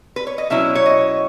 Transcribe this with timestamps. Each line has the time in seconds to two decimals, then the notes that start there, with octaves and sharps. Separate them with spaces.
0.16 B4
0.27 C#5
0.38 D#5
0.50 B2 F#3 C#4 E4 E5
0.75 C#5
0.86 D#5